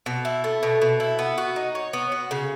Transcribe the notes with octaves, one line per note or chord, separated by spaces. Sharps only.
B2
E4
A3
B2
B2
E4
B3
F#4
D#4
C#5
B3
F#4
C#3